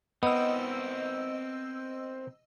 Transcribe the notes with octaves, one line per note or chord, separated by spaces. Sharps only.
B3 C4 A#4 D#5 E6